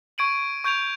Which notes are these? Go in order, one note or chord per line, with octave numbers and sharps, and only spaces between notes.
C#6 G#6 D7 D#7 F#7
C#6 G6 G#6 D7 F7